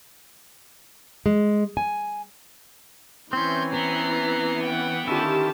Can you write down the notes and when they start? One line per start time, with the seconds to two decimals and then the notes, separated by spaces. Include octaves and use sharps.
1.26 G#3
1.77 G#5
3.33 E3 C4 C#4 C6 G6
3.74 B3 A#5 C7
4.64 F#5 G5
5.07 D3 D#3 C#4 E4 F4 G4 A5